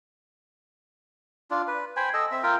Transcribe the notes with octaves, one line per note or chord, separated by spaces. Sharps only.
D4 F4
B4
C5 G5 G#5 B5
A4 D#5 E6
C4 E5
F4 A#4 G5